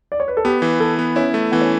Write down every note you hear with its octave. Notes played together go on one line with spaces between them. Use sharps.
D5
C#5
B4
A4
B3 G4
E3
E3 A4
B3
C#4 E4
A3
E3 B3
C#4